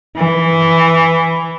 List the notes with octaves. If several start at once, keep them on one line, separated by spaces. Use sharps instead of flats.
E3